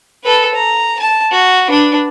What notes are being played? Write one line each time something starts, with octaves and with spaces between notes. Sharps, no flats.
A4 B4
A#5
A5
F#4
D4 B4